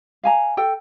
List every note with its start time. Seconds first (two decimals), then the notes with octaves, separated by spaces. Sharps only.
0.24 F5 G#5 A#5
0.57 A4 G5